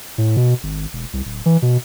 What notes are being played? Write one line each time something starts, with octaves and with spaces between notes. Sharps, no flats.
A2
B2
G#1
E1
C2
D1
E3
B2